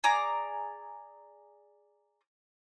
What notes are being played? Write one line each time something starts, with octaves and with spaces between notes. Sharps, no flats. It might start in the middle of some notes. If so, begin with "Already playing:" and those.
G#4 D5 A#5 D6